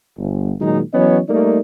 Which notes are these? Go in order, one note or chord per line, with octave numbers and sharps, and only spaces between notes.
G1
A#2 D#3 F#3 G#3 D#4
E3 F#3 B3 C#4 C#5 D#5
G3 A3 A#3 D#4 A#4 D5